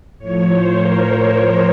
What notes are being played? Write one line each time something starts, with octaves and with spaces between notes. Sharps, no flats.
A2 F3 C#5
C5
A#4
A#4